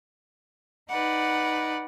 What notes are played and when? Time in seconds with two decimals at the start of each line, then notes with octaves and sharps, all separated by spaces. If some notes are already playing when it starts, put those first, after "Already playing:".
0.90 D#4 B4 D5 F#5